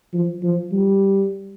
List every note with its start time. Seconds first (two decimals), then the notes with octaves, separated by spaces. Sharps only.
0.14 F3
0.43 F3
0.72 G3